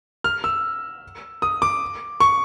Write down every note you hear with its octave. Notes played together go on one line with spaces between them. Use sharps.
F6
E6
D#6
D6
C#6